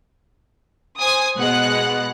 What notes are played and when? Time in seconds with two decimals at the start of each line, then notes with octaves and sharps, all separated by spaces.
0.98 C5 G#5 D#6
1.39 B2 G#3 B3 F#5 F#6